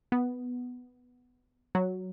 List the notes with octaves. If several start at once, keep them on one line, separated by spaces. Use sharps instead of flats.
B3
F#3